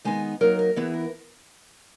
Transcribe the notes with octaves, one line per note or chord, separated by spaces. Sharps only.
D#3 G#3 B3 D#4 G#5
F#3 A#3 D#4 A#4
A#4
E3 B3 E4 G#4
A#4